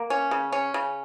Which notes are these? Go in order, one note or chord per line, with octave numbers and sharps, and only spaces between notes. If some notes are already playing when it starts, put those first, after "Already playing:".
Already playing: A#3
C#4
C#3
C#4
C#3